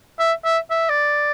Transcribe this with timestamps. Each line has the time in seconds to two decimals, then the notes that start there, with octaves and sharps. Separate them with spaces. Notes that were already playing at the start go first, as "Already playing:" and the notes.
0.19 E5
0.45 E5
0.71 E5
0.89 D5